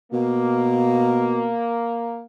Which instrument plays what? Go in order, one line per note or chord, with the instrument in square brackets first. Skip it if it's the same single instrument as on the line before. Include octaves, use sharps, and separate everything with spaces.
[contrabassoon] B2 [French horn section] A#3